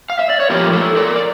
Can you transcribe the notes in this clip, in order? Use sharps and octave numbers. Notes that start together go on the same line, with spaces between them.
F5
E5
D5
C#5
A#2 F3 A3 G4 A#4
A4 C#5
A#4 D5
D5